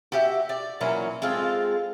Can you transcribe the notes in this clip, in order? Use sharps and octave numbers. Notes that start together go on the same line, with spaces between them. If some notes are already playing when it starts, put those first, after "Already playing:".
F#4 G4 E5
D5
A#2 E3 F#3 C#4
G#3 C4 F4 A4